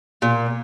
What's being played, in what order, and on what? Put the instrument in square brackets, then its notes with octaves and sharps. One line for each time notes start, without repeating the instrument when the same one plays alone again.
[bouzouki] A#2